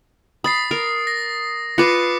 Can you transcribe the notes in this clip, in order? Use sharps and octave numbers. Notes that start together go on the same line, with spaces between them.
B5 D#6 A6 C7
A#4
A#6
F4 B4 D6 F#6 C#7